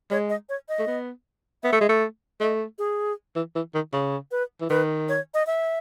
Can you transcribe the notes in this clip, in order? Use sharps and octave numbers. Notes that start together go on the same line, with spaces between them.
G#3 C#5
D#5
C#5
D#5
A3
B3
B3 E5
A3
G#3
A3
A3 D#5
G#4
E3
E3
D#3
C#3
B4
E3
D#3 B4
C#5
D#5
E5